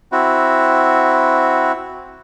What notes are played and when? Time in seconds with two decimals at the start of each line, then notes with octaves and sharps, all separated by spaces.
0.12 C4 E4 F#4